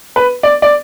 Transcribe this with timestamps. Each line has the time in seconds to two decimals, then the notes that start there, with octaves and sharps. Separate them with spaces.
0.16 B4
0.43 D5
0.62 D5